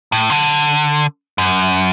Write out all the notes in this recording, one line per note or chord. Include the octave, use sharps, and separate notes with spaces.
A2
D3
F#2